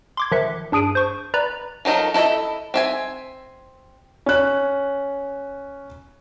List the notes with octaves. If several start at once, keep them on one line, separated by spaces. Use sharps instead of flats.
C6 D6 G#6
D#3 F3 E5 F#6 C#7
G2 D4 G#4 D7 D#7
C5 C#6
B4 D5 A#5 B5
F3 F#3 D#4 A4 A#4
E4 A4 C5 D#5 E5
C4 E5 G#5
C#4 F#6